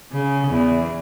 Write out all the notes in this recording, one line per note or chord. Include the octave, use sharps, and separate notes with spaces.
C#3
E2